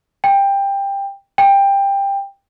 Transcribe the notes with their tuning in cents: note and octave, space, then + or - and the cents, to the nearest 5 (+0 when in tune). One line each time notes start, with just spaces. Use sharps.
G5 +15
G5 +15